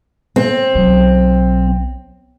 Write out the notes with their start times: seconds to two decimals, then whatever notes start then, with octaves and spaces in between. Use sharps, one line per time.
0.36 C4
0.75 B1 F#3